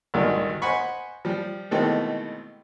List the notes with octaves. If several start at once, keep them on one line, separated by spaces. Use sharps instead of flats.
G#1 D2 G2 A#2 D#3
C5 D#5 F#5 G#5 B5 C#6
F3 G3
B2 D#3 E3 G#3 A3 C4